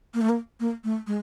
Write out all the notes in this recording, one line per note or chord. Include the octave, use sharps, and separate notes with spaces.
A#3
A3
A#3
A#3
A3
G#3